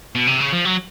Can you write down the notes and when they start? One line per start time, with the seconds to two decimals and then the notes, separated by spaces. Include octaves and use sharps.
0.15 B2
0.27 C3
0.40 C#3
0.53 F3
0.65 F#3